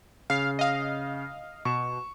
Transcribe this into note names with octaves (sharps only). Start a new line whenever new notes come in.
C#3 F5 C7
D#5 F5
B2 C#6 E7